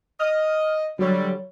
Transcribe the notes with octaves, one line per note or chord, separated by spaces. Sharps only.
D#5 F6
D3 F#3 G3 C#5